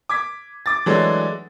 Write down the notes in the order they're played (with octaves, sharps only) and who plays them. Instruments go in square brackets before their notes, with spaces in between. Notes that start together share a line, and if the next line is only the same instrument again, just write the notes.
[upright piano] D6 G#6 B6
D6 A6
E3 F#3 G#3 A3 D4